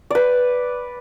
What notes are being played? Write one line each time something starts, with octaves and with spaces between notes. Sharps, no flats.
B4 D5